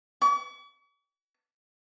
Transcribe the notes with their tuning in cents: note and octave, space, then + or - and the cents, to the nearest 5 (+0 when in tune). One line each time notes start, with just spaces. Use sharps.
C#6 +45